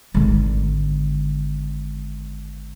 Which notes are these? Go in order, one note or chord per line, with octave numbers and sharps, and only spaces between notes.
G#1 D3